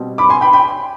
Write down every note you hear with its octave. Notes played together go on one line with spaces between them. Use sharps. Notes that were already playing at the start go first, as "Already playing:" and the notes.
Already playing: B2 G3 C4
B5 D6
G#5 C6
G5 B5
G5 B5